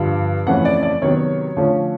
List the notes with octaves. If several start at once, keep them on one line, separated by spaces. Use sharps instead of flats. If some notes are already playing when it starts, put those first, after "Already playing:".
Already playing: G2 D3 F3
F2 C#3 E3 A3 C#4 F#5
D5
D5
C3 D#3 F#3 B3 C#5
D3 F3 A3 C#4